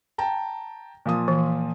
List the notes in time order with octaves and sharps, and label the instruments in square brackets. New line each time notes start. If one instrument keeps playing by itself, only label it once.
[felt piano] G5 A5 A#5
A#2 F3 D#6
[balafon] E3